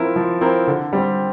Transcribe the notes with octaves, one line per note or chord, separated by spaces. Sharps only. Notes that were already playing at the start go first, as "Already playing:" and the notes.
Already playing: F3 C4 E4 A#4
F3
C4 E4 A#4
D3
G3 C4